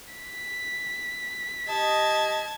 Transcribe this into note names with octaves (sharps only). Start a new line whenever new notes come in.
B6
G4 D#5 A5 G#6